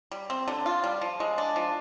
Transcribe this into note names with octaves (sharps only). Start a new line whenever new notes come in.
G3
C4
D3
F4
G3
F3
G#3
D4
F3